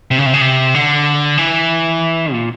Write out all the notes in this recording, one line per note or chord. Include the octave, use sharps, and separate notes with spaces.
C3
C#3
C3
C#3
C3
D3
E3
A#2